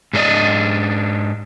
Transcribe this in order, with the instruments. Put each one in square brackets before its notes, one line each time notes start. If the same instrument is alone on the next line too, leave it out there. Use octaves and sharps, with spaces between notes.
[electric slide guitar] G#2 F#3 D4 D5 D#5